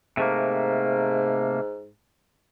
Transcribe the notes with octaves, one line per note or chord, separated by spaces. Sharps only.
G#2 C3 A3 A#3